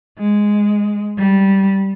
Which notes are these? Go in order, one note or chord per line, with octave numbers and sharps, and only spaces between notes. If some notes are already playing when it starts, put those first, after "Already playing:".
G#3
G3